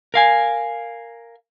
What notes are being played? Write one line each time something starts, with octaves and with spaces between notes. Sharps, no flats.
A#4 F5 G#5